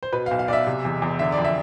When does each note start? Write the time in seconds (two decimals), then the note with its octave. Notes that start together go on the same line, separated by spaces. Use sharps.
0.03 C5
0.12 B2 B4
0.26 F5
0.31 B1
0.39 F5
0.48 B1 D5
0.53 E5
0.67 C3
0.85 E2
1.02 E2
1.19 D3 E5
1.32 D5
1.37 F2
1.45 E5